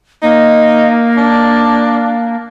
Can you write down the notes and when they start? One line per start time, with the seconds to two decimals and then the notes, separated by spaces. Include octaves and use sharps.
0.23 A#3 D#4
1.17 D4